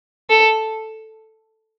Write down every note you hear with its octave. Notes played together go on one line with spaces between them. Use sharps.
A4